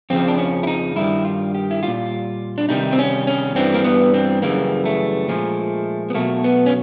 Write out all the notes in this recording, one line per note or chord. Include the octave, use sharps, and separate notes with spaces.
F2 C#3 F3 C4
D4
C#4
E4
D#4
G2 D#3 G3 E4
F4
G4
E4
A#2 G3 F4
D4
C3 D#3 G3 D#4
C4
C#4
C#4
G2 E3 G3 C4
A#3
B3
C4
F#2 C#3 E3 G3 A#3
A3
A#2 F3 G#3
B3
B2 F#3 A3 A#3
B3
C#4